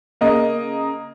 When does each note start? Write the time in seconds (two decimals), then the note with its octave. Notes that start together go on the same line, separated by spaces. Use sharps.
0.21 C#3 A#3 D#5